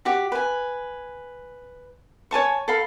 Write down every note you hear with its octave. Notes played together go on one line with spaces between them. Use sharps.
F#4 G4
B4 G#5
C#5 G#5 A5 C#6
A4 F5 B5